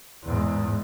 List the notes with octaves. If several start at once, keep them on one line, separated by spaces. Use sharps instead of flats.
E2 G#2